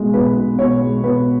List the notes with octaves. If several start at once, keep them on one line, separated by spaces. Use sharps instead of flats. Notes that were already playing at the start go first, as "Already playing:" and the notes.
Already playing: B1 G#3
B1 B4
B2
B2 C#5
G#3
B2 B4